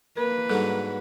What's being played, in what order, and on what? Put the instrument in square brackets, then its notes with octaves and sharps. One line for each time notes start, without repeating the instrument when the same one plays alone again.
[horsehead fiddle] A#3 B4 [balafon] A#4
[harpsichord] G#2 D3 F#3 [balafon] G3 A4